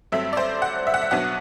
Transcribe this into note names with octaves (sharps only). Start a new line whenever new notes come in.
G2 F#3 A3 C4 E5
D5
C5
F#5
E5
F#5
E5
B1 B2 F#3 B3 D4 F#5